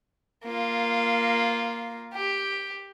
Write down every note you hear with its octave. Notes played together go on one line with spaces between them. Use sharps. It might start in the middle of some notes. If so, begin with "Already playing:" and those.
A#3 F4
G4